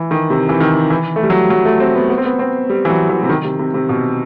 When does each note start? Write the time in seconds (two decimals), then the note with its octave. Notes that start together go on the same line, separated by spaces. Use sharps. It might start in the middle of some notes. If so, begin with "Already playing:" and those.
Already playing: E3
0.11 D#3
0.30 C3
0.49 E3
0.60 D#3
0.90 E3
1.16 A3
1.23 G3
1.30 F#3
1.50 F#3
1.65 A3
1.80 C4
1.95 B3
2.10 B3
2.18 C4
2.25 B3
2.39 C4
2.70 G3
2.85 E3
2.90 F#3
3.10 E3
3.23 C3
3.29 D#3
3.44 C3
3.59 C3
3.74 C3
3.89 B2